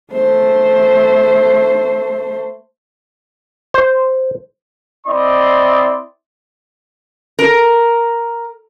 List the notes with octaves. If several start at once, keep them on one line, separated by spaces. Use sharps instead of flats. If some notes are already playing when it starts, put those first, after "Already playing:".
A3 C5
C5
C4 E4 D5 D#5 C6
A#4